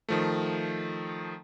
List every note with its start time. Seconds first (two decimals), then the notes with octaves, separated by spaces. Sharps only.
0.09 D#3 F3 A3